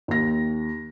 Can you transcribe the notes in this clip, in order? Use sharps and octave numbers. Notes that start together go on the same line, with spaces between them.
D#2 A#6